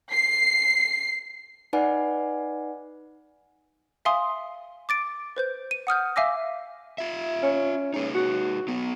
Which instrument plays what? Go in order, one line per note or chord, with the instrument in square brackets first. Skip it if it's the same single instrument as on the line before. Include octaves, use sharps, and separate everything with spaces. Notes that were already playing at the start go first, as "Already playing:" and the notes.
[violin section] C7
[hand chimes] D#4 B4 D5 F#5 G#5
[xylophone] E5 F5 G#5 C6 D#6
D6 A6 D7
B4 C5 G6
D#7
F#5 D#6 F6 G6
E5 F5 G#5 D6 E6 A#6
[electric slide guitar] F4 E5
[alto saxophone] C#4
[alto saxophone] C#4 [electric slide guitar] D#4 G#4 B4
[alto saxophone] F#4
[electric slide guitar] F#3 B3